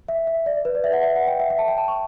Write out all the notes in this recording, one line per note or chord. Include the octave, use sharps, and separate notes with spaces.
E5
E5
D5
B4
D5
E5
F#5
E5
F#5
G5
E5
E5
A5
G5
A5
C#6